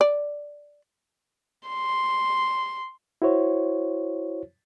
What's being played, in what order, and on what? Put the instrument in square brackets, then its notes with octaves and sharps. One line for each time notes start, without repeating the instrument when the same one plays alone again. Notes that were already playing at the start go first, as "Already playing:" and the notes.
[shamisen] D5
[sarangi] C6
[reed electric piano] E4 F#4 C5 C#5